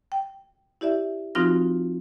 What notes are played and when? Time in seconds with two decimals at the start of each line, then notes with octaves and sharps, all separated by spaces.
0.12 G5
0.81 E4 G4 D5 E5
1.35 F3 C4 D#4 F4 F#4 A#6